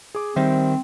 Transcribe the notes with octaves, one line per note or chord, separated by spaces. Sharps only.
G#4 D6
D#3 G3 C4 C5 E5